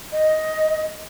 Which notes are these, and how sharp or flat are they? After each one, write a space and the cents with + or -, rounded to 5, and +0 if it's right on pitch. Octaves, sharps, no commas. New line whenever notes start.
D#5 +5